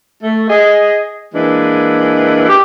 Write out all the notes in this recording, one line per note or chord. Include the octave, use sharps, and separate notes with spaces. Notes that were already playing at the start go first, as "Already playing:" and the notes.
A3
G#4 D#5
E3 G#3 A#3 D4
G4